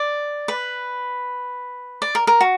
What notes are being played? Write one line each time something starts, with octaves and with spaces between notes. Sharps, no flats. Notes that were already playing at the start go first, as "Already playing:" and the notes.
Already playing: D5
B4
D5
A#4
A#4
F#4